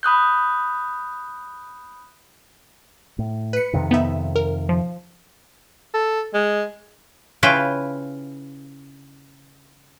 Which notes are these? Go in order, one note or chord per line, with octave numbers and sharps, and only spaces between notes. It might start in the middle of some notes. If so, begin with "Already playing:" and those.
B5 D#6 F#6 G6
A2
B4 C#7
F2 C3 D#3
B3 D#4 E5
A#4
F3
A4
G#3
C#3 E4 F4 B4 G5